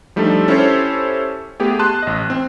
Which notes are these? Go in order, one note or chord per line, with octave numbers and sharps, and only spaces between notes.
F3 G3 A3 D4 D#4 A4
C#4 E4 G4 A4 C5 C#5
A3 B3 G4 G#4
A5 C6 F#6 D#7
A1 D#5
C4